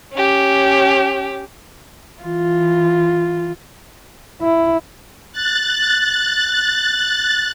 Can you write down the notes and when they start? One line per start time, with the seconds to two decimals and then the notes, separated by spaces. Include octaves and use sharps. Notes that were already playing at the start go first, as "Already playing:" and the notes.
0.12 C#4 G4
2.21 E3 F4
4.42 E4
5.33 F#6 A6